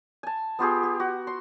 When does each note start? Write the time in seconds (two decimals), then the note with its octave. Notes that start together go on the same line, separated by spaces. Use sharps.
0.23 G#5 A5
0.59 B3 F4 G4 G#4
0.83 G4
1.00 F#4
1.27 C6